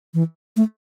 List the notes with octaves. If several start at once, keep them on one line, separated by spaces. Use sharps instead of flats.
E3
A3